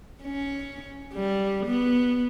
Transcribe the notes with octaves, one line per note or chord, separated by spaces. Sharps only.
C#4
G3
B3